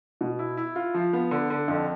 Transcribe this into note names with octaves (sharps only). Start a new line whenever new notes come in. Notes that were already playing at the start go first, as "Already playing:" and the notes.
B2
E4
E4
F4
F3
B3
D3
D3
F2